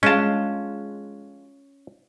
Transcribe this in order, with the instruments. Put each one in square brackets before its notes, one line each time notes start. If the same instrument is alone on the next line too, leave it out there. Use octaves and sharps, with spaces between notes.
[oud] G#3 F4 [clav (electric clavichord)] C#4 A5